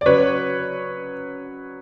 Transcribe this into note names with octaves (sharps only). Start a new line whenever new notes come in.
D5
C#3 F#3 B4 C#5